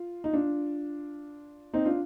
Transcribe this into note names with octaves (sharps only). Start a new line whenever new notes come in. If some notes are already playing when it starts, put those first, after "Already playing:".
Already playing: F4
D#4
D4 F4
C4 D#4
D4 F4